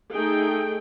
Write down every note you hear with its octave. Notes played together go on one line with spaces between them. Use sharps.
A3 D#4 G#4 G5